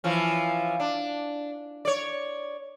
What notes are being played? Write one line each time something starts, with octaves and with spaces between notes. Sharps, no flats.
E3 F3 C#4
D4
C#5 D5